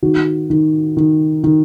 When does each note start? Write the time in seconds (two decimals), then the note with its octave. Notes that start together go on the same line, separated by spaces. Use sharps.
0.03 D#3 F#4
0.50 D#3
0.97 D#3
1.44 D#3